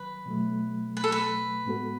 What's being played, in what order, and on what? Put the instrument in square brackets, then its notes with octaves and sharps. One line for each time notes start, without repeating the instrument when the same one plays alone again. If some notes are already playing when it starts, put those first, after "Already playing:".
Already playing: [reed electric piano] D#3 F#3 [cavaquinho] B4
[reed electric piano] B2 F#3 A3
[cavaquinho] B4
A4
B4
[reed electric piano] A2 G#3 B3 F#4 A4